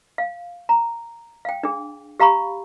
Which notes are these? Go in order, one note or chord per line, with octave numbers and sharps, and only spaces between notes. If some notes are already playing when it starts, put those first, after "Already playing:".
F5
A#5
F5 G5
D4 G#4
G4 F5 A#5 B5 C#6